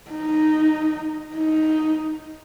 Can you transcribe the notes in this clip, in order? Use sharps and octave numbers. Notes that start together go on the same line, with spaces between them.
D#4
D#4